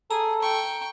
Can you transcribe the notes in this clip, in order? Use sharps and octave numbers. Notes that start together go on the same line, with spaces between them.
G#4 A4 A#5
G5 C#6